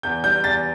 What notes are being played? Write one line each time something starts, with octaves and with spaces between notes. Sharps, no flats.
E2 G6
G3 G6
E2 A6